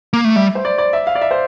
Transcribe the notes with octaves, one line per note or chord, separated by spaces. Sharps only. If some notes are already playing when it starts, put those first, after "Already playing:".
A#3
A3
G3 E5
C5
D5
D5
E5
F5
D5
E5
C5